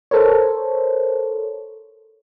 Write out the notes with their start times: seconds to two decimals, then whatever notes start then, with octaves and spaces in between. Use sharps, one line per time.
0.11 A4 A#4 C5 C#5